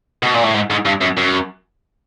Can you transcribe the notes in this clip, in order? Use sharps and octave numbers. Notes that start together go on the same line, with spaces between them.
B2
A#2
A2
G#2
G#2
G2
F#2
F#2